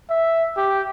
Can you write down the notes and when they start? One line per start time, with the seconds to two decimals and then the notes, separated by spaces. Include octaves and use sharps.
0.10 E5
0.57 G4